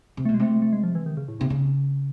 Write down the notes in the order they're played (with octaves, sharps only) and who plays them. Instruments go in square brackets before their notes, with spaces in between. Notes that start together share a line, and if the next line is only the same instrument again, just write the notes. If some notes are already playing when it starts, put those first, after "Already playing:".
[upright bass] C3
[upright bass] B2 [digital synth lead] A3
[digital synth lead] G#3
[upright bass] C3 [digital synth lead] A3
[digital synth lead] A3
G#3
F3
E3
D#3
C#3
A2
[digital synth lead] G#2 [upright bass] C3
[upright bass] C#3